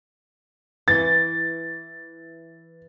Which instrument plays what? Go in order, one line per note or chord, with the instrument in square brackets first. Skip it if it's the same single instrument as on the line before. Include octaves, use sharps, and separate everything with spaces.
[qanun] E3 C#5 [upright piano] A6